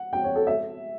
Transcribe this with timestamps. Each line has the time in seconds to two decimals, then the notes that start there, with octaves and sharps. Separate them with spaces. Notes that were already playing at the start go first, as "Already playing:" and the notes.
Already playing: F#5
0.13 G5
0.24 C#5
0.36 A4
0.47 E5